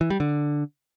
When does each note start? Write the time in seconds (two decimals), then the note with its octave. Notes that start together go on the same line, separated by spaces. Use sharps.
0.01 E3
0.10 G3
0.20 D3